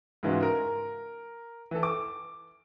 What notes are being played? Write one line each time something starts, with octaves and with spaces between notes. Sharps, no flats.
G#2 C#3 E3 G#3 F4 F#4
A#4
E3 A4
D6